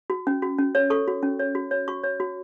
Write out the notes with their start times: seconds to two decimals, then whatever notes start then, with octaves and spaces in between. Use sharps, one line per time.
0.10 F#4
0.27 C#4
0.42 F#4
0.58 C#4
0.75 C#5
0.90 A4 C#6
1.08 F#4
1.23 C#4
1.39 C#5
1.55 F#4
1.71 C#5
1.88 F#4 C#6
2.03 C#5
2.20 F#4